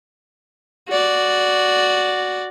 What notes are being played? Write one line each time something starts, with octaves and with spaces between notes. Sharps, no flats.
F#4 D5